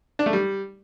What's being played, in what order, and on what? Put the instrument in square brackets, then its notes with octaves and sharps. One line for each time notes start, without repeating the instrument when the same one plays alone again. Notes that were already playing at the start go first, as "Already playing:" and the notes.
[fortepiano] D4
A3
G3